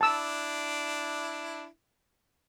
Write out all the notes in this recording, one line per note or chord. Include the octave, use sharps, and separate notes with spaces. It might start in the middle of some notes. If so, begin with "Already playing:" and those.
D4 E4 A5 E6